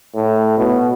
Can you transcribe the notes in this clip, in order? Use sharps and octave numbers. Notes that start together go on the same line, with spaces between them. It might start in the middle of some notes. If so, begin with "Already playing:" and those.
A2
B2